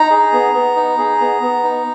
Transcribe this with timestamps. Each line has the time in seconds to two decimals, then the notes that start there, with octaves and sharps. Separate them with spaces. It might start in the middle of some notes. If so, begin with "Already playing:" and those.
Already playing: D#4 A#5
0.10 G#4
0.32 B3
0.54 B3
0.76 D#4
0.98 G#4
1.20 B3
1.42 B3
1.63 D#4